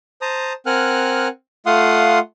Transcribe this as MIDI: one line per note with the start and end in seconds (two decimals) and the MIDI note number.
0.22 0.53 72
0.22 0.53 81
0.22 0.53 82
0.22 0.53 87
0.66 1.28 60
0.66 1.28 70
0.66 1.28 78
0.66 1.28 80
0.66 1.28 89
0.66 1.28 90
1.66 2.19 57
1.66 2.19 65
1.66 2.19 77
1.66 2.19 78
1.66 2.19 84
1.66 2.19 87